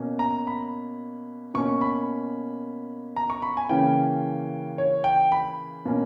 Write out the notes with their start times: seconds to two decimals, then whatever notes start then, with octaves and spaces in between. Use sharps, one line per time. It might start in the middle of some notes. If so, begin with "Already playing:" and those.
Already playing: B2 A#3 C#4
0.19 A#5
0.47 B5
1.54 B2 A#3 C#4 C#6
1.81 B5
3.16 A#5
3.30 C#6
3.42 B5
3.57 G#5
3.69 C#3 E3 A#3 C#4 G5
4.78 C#5
5.04 G5
5.32 B5
5.85 B2 A#3 C#4